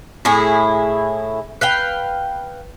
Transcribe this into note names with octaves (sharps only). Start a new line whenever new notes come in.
A2 E4 G#4
B4 F5 G5